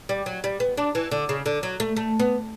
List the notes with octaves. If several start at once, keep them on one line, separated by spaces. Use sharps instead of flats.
G3
F#3
G3
B3
D4
E3
D3
C#3
D3
F#3
A3
A3
B3